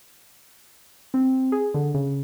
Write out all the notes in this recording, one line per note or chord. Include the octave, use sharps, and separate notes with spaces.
C4
G#4
D3
C#3